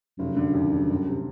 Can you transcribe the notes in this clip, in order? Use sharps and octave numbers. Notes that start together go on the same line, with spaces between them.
F1 F#2
D3
D#2
F1
G1
C3